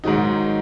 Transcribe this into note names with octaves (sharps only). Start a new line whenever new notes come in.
G#2 D#3 F#3 D#4